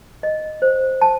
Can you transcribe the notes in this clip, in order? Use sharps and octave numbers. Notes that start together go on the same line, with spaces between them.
D#5
C5
A5